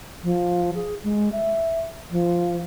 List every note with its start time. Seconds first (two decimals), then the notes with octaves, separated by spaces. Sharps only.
0.23 F3
0.75 G#4
1.04 G#3
1.32 E5
2.11 F3